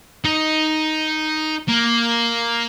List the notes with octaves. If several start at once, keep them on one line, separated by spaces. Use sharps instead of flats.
D#4
A#3